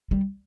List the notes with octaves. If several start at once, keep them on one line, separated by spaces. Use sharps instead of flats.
G3